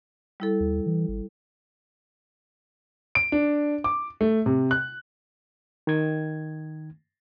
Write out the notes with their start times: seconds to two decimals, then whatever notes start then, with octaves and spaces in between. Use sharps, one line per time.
0.40 G3 E4 A4
0.60 D#2
0.86 E3
1.08 G#1
3.15 D7
3.32 D4
3.84 D6
4.21 A3
4.46 C3
4.71 F#6
5.87 D#3 G#6